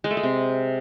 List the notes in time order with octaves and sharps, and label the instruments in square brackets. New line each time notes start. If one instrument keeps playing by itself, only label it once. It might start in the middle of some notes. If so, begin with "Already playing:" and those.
[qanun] G#3
A3
G#3
C3